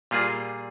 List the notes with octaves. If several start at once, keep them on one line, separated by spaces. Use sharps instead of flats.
A#2 G3 A#3 F4 G#4